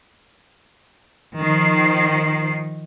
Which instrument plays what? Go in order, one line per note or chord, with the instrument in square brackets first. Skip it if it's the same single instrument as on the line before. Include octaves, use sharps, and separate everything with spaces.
[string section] D#3 F3 C7